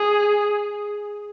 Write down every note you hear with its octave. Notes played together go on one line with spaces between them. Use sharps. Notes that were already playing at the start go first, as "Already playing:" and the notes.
Already playing: G#4